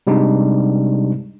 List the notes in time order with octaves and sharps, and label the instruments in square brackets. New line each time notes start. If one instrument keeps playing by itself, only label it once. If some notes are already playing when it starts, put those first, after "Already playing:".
[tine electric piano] C3 G3 G#3 D4 D#4